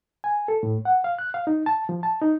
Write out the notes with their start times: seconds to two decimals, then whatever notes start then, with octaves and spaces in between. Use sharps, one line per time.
0.24 G#5
0.48 A4
0.63 A2
0.85 F#5
1.04 F5
1.19 F#6
1.34 F5
1.47 D#4
1.66 A5
1.89 F3
2.03 A5
2.21 D#4